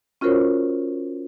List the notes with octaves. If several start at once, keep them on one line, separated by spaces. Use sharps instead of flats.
C#4 F4 F#4 A#4 C5 C#5